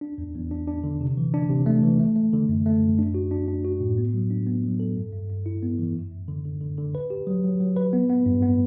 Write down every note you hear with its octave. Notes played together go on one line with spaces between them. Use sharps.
D4
E2
E2
D4
D4
D3
C3
E3
D4
C3
A3
E3
A3
A3
D3
F#2
A3
F#2
D4
F#4
D4
D4
F#4
A2
B3
F#3
D4
B3
F#3
A4
G2
G2
G2
E4
B3
E3
F#2
F#2
D3
D3
D3
D3
B4
G4
F#3
F#3
F#3
B4
B3
B3
G2
B3